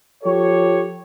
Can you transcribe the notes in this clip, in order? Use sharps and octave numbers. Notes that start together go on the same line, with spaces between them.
F3 G4 A4 C#5